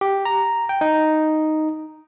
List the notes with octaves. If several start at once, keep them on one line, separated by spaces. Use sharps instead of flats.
G4
A#5
G5
D#4